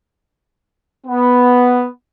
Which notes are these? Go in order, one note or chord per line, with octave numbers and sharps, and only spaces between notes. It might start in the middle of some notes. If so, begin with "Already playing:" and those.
B3